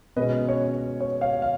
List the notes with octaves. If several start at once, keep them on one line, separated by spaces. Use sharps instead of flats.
B2 G#3 C#4 B4 D#5
C#5
C#5
C#5
C#5 F5
F5